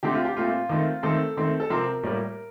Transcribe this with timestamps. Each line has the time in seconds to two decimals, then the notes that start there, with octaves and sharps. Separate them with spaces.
0.03 D3 A3 C4 G4
0.14 F4
0.25 G4
0.37 A#2 A3 C4 F4
0.69 D#3 A3 C4
1.03 D#3 A3 C4 A4
1.37 D#3 A3 C4
1.60 A4
1.70 C3 F3 C4 A#4
2.03 A2 G3 A#3